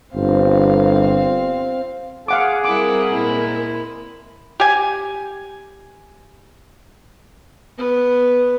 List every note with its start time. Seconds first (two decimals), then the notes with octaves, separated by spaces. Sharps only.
0.14 G1 C4 F5
2.28 G#4 F5 F#5 D6
2.65 G3 C4 E4 A#4 F#5 D6
3.08 A#2 G#3 E4
4.60 G4 G#5
7.78 B3 B4